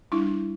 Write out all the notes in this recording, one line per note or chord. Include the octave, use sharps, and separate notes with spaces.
G3 D4 E4